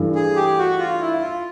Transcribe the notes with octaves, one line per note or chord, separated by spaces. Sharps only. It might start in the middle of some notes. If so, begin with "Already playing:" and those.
Already playing: G2 E3 A3
G#4
G4
F#4
F4
E4
F4